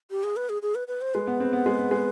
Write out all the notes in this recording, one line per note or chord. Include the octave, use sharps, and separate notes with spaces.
G4
G#4
B4
G#4
G#4
B4
B4
C5
G#3 B4
B3
C4
B3
G#3
B3
G#3